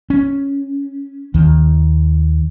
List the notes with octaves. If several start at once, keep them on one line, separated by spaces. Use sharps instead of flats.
C#4
D#2 D#3